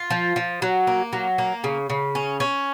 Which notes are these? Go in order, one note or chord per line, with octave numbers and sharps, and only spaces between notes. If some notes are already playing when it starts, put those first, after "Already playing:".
Already playing: F4
F3
F3
F#3
A#3
F#3
A#3
C#3
C#3
C#4
C#4